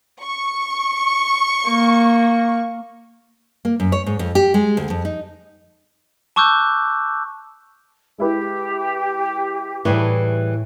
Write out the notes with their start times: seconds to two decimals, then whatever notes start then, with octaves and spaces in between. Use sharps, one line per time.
0.22 C#6
1.68 A#3
3.65 A#3
3.80 F#2
3.92 C#5
4.06 G#2
4.19 F2
4.35 G4
4.54 G#3
4.77 D2
4.90 F2
5.05 D#4
6.36 A5 C#6 D6 E6 F#6 G6
8.18 G#3 E4 G4 B4
9.85 A2 E3 G3 G#4 C#5